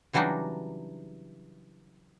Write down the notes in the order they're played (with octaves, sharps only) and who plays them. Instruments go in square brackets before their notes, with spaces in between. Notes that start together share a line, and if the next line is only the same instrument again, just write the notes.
[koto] C#3 E3 F#3 G3 D4 D#4